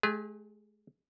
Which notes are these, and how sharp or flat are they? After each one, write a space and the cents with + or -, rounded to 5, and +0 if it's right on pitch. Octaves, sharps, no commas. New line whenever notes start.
G#3 +45 G#4 -30